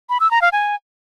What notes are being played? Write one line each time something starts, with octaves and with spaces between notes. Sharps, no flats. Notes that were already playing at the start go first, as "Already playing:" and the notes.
B5
E6
A#5
F5
G#5